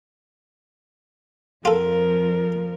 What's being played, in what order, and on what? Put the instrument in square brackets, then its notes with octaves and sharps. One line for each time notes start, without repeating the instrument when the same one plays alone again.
[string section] F2 F3 [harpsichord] F4 A4 [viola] A#4